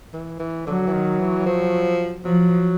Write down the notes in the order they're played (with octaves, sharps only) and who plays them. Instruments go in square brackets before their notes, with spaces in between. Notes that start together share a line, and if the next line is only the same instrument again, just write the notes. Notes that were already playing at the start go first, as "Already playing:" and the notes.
[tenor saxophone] E3
E3
[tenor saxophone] D3 [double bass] F#3
[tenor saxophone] E3
D#3
E3
F3
[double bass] F3 [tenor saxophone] F#3